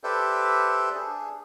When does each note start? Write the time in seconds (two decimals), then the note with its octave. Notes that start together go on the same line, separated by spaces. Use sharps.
0.04 G4 A4 B4 C5 D5 E5
0.95 D4 G#4